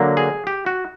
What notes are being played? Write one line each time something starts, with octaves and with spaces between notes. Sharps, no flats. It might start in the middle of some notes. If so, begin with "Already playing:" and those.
Already playing: D3 F#3 A#3
G#4
G4
F#4